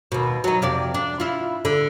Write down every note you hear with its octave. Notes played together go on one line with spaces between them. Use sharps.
D#2 B2
F#3 D#4
F2 C3 D5
D4
E4 F4
D3